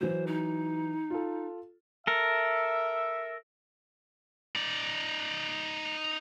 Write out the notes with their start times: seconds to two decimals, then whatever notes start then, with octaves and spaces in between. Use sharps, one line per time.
0.01 E3 F#3 C5
0.27 D#4
1.10 F4 A4
2.07 A4 A#4 E5
4.56 D#4 D5